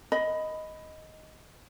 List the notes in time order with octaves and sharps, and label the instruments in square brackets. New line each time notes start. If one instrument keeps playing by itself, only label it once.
[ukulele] D#5 B5